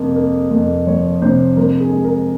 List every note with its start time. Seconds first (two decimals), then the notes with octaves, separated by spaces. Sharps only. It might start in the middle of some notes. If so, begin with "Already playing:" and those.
Already playing: F2 C3 A#3
0.16 A#3
0.51 F2
0.87 F3 C#5
1.22 C3 C5
1.57 F3 A#4
1.80 G#4
1.92 G#3
2.05 A#4